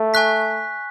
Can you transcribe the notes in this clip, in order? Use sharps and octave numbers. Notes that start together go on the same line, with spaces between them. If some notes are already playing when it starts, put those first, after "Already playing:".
Already playing: A3
G#5 C#6 F#6 B6